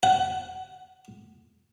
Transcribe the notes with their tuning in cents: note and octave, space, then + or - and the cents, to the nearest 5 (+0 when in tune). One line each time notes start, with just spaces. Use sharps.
F#5 +20